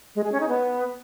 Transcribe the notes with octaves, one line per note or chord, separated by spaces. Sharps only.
G#3
G#4
C#4
D#4
B3